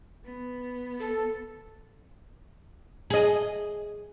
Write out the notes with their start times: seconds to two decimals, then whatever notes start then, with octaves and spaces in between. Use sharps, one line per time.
0.25 B3
1.00 A4
3.10 G#4 D#5